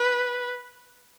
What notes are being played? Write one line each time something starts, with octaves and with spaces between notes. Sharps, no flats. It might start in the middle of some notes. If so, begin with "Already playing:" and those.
Already playing: B4